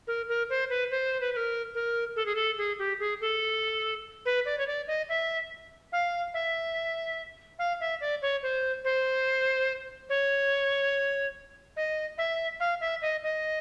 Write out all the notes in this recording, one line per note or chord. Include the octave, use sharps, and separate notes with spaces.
A#4
A#4
C5
B4
C5
B4
B4
A#4
A#4
A4
G#4
A4
G#4
G4
G#4
A4
B4
D5
C#5
D5
D#5
E5
F5
E5
F5
E5
D5
C#5
C5
C5
C#5
D#5
E5
F5
E5
D#5
D#5